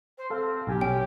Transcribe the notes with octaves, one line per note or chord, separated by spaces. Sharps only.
C5
C4 A4 F5
B1 G4 G#5
C#4 G5